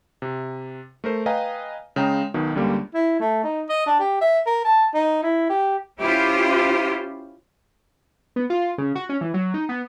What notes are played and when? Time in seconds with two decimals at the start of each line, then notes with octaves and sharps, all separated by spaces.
0.22 C3
1.04 A3 A#4 C5
1.26 B4 D#5 F5 G5 G#5 A#5
1.96 C#3 G#3 G5 A#5
2.34 B1 B2 D#3
2.55 C#2 D3 G3 A#3
2.94 E4
3.20 A3
3.44 D#4
3.69 D#5
3.86 D4
4.00 G4
4.21 E5
4.46 A#4
4.65 A5
4.94 D#4
5.23 E4
5.49 G4
6.00 C#4 E4 F4 G4 C5
8.36 B3
8.50 F4
8.78 C#3
8.95 F#4
9.09 C#4
9.21 E3
9.34 F#3
9.54 D#4
9.69 B3